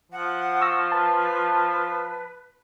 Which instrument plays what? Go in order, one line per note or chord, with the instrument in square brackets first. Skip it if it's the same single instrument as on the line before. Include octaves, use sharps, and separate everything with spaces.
[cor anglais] F3 [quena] F#5
[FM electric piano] C#6 E6 A#6
[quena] B4 [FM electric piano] A5